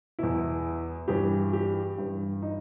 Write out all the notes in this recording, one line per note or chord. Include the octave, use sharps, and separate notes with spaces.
E2 B2 E4
G2 E3 G4
G4
G2 E3
D#4